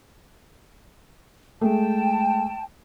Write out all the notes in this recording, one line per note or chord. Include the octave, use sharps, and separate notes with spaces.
G#3 A3 G5 A5